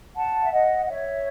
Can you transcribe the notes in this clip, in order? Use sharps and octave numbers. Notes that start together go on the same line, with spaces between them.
F#5 A5
E5
D#5 F#5
F#5
C#5 E5